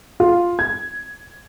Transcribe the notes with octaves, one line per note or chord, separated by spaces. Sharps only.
F4
G#6